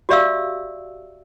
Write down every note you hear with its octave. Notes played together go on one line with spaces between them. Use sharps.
F#4 G4 D5 E5 F5 E6